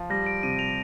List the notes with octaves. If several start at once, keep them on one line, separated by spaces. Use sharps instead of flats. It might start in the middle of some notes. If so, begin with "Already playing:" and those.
Already playing: F3
G3 A#6
D7
C3 D#7
F7